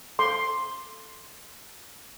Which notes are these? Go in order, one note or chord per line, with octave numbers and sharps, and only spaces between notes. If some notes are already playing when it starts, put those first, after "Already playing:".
A4 C6 D6